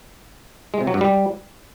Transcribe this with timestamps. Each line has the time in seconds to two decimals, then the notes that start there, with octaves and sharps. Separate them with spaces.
0.74 G#3
0.81 C3
0.87 F#3
0.94 G2
1.01 G3